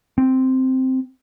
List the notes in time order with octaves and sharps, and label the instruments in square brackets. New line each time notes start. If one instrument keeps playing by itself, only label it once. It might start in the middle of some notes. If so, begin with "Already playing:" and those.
[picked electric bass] C4